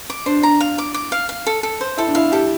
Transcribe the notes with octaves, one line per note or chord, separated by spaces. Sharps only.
D6
D4 C5
D4 A#5
F5
D6
D6
F5
F5
A4
A4
C5
E4 A4
D4
E4 F5
G4 A4